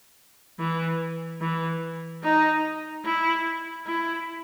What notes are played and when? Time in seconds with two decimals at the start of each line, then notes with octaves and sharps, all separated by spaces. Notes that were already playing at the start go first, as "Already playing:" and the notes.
0.59 E3
1.41 E3
2.23 D#4
3.05 E4
3.86 E4